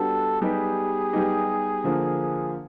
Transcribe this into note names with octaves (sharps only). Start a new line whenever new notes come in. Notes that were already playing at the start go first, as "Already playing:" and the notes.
Already playing: G3 B3 D4 F#4 A4
G3 B3 D#4 G4 G#4
G3 B3 D#4 G4
D3 F3 A#3